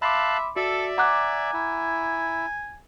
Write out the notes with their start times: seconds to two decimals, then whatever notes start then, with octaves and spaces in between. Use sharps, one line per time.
0.02 E5 F5 A5 B5 C6 D6 F#6
0.56 F#4 A4 D5 E5
0.98 F#5 G#5 A#5 D6 F#6
1.53 E4